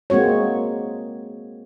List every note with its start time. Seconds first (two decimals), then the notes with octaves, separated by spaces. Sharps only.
0.10 G#3 A#3 C4 F#4 C#5